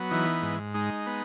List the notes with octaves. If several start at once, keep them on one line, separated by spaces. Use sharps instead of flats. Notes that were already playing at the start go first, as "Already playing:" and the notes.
Already playing: F#3 B3
E3 D#4
G#2
G#3 D#4
B3